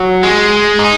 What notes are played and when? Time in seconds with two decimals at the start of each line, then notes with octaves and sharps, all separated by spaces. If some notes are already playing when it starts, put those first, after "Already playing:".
Already playing: F#3
0.23 G#3
0.79 D#4